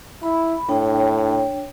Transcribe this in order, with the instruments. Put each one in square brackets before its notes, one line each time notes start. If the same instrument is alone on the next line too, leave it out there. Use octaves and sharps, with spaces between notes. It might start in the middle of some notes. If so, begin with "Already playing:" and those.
[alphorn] E4 [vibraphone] B5
[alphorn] A2 [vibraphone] D4 C#5 G5